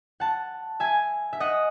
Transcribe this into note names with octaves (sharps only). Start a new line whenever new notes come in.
F#5 A5
E5 G#5
E5
D#5 F#5